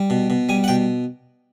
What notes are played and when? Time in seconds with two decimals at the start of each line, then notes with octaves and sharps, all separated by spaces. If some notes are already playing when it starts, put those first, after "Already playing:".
Already playing: G3
0.10 B2
0.30 B2
0.49 G3 G#5
0.64 F#5
0.68 B2 G5